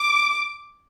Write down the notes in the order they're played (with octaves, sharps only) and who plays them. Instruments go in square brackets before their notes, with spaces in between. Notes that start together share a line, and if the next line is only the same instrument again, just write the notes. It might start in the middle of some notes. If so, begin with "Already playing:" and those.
Already playing: [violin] D6